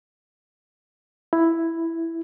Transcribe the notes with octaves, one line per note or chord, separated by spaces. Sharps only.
E4